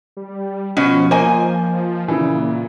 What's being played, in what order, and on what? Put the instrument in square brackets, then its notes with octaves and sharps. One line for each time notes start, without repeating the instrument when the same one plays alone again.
[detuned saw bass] G3
[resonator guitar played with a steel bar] B2 C#4 [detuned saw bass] F3
[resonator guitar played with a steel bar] A#3 G#5 [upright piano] C5 D#5
[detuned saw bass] A#2 [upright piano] C#3 E3